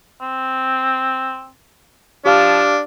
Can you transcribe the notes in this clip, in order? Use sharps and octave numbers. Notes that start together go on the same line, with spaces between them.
C4
F3 D4 G4 F5 F6